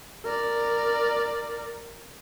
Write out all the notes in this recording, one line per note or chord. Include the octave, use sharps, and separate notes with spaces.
A#4 D5